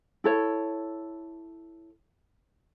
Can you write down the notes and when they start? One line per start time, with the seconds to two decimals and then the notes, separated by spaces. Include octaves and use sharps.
0.24 E4 A4 C#5